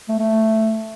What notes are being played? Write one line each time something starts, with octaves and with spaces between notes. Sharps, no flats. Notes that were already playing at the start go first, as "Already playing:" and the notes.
A3
A3